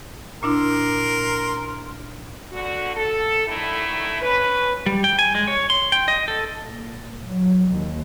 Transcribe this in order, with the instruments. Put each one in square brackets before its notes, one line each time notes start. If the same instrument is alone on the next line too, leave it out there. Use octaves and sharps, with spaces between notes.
[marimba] A#2 D4 E4 [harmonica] A#4 C6
[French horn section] D3 F#4
A4
A2 D3 D#3 A3 E4
C#4 B4
[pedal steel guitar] G3
G5
G#5
G#3
C#5
C6
G5
D#5
A4
[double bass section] A#2
F#3
D#2